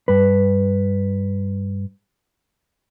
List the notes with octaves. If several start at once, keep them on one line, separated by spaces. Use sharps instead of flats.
G2 B4